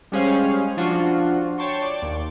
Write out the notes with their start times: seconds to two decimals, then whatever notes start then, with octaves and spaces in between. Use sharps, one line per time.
0.12 G3 G#3 C#4 G#4 C5 F5
0.77 F3 D4 F4 F#4
1.58 C#5 G5 A5 C6 C#6
1.82 D5 D6
2.02 D#2